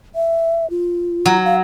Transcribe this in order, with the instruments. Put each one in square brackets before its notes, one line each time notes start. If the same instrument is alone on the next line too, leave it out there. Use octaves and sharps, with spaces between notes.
[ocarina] E5
F4
[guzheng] F#3
[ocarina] F5